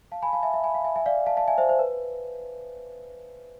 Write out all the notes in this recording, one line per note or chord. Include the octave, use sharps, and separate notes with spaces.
F5 A5
G#5 B5
F5 A5
E5 G#5
E5 G#5
G#5 B5
F5 A5
E5 G#5
E5 G#5
D5 F5
F5 A5
F5 A5
E5 G#5
C5 E5
C5
B4